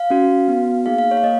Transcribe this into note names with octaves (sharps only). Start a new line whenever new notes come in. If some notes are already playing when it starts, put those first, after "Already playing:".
Already playing: F5
C#4 F#4
B3 F#4
A#3 D#4 G#4 F5
F5
C#5
F5
A#3 D#5